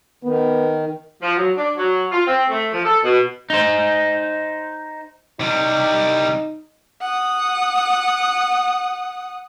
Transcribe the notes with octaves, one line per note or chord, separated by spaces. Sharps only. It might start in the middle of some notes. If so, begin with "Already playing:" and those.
D#3 B3
F3
F#3
D4
F#3
F4
C4
A3
F3
A4
B2
D#4 C5
C3 G3 D#4
F#5 D#6